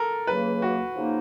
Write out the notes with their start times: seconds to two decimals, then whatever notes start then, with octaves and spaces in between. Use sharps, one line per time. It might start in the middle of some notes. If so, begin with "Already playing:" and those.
Already playing: A4 A#4
0.27 C#2 C#3 F#3 A#3 B4
0.62 F#4
0.96 C#3 F3 A#3 D#4